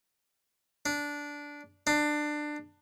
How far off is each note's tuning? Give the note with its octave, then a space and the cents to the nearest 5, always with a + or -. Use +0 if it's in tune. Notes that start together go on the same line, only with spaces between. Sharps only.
D4 -10
D4 +20